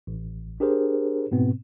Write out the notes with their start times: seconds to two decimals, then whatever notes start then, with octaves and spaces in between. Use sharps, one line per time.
0.07 A1
0.60 D4 G4 G#4 A#4 C5
1.32 G#2 B2 B3 C4